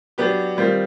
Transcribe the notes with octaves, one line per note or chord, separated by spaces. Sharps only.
F#3 B3 D4 G4
D#3 G3 C4 F4